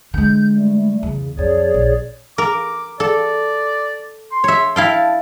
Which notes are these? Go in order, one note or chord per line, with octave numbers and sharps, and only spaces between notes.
D3 G#3 G6
G3 A3
E2 C#3
F2 G#4 C#5 D5
A#1
A#4 D6
A4 D5
C6
C#5 E5
E4 F5 G5 A5